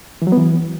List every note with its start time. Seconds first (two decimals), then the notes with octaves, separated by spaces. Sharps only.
0.22 E3
0.27 F#3
0.32 B3
0.37 E3